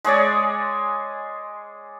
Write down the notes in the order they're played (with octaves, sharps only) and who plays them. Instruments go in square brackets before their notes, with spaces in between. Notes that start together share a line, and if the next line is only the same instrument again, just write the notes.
[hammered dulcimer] G#3 G#4 C#5 D5